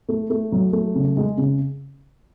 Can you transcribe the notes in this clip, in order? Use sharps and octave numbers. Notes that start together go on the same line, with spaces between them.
A3
A3
F#3
A3
C#3
G#3
C#3